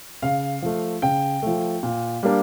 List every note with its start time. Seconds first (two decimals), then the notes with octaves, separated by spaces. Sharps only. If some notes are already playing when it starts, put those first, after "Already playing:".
0.23 C#3 F5
0.62 F3 A3
1.02 C#3 G5
1.43 F3 A3
1.83 A#2
2.23 G3 A#3 D4